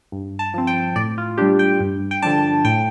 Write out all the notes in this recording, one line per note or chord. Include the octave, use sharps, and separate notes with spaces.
G2
A5
F3 C4
G5
A2 D5
F4
G3 D4 G4
G5
G2
G5
D3 F3 D4 A5
A2 G5